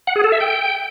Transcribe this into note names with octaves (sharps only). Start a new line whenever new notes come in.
F#5
G#4
A4
E5
G5